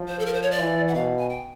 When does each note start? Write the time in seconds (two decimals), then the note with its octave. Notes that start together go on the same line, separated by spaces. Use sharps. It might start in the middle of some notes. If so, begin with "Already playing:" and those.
Already playing: F3
0.08 C5
0.19 A4
0.26 A#4
0.34 C5
0.43 C#5
0.51 D5
0.60 E3
0.88 F#5
0.94 B2 F5
1.19 G#5
1.29 G5